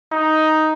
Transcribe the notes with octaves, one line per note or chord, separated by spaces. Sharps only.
D#4